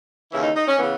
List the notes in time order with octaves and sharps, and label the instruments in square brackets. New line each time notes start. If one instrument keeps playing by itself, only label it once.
[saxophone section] D#2 C#3 E3 E4
D#4
D#4
C#4
C#3 E3 B3